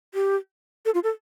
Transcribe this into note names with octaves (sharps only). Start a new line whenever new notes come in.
G4
A4
F4
A4